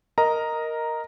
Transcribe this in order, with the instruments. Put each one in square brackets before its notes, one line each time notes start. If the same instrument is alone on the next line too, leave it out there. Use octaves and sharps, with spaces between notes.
[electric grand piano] A#4 D#5 A#5